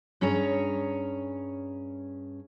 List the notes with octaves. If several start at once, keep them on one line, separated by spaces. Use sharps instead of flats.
G2 C#4 G#4 C#5 A#5